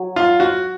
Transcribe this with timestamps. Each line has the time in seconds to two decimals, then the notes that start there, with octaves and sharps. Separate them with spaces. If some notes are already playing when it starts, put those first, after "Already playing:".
Already playing: F#3
0.16 F4
0.40 F#4